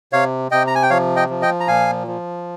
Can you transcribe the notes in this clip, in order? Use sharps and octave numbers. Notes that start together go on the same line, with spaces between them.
C3 C#5 F5
C3 D#5 G5
A#5
G#5
G5
F3 C#5 F5
D#5 G5
F3
D#5 G5
A#5
A#2 F5 G#5
F3